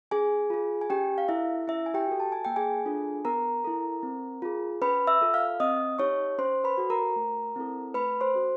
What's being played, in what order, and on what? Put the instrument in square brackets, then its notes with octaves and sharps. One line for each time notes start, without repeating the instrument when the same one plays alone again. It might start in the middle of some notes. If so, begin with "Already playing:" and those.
[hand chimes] C#4 G#4 G#5
F4 G#4
G#5
C#4 G4 G5
F5
E4 A4 E5
C#4 E4 E5
G#5
G4 G5
F#4 A4
A5
G#5
A#3 G5
G#4 G#5
D4 F4 A4
B3 A#4 A#5
E4 A4
C4
F4 G#4
C#4 B4 B5
E5 E6
F4 A4
F5 F6
C4 D#5 D#6
D#4 G4 C#5 C#6
C#4 C5 C6
B4 B5
F#4 A4
A#4 A#5
A3
C4 E4 A4
A3 B4 B5
C5 C6
C#4 F#4 A4